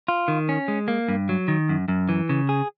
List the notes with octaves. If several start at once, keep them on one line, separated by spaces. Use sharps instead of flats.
F4
D#3
C#4
G#3
A#3
G2
F#3
D#3
F#2
F#2
E3
C#3
G#4